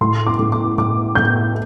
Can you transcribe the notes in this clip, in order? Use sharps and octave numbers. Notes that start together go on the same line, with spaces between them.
A2 C6
D6
A2
D6
A2 D6
A2 G6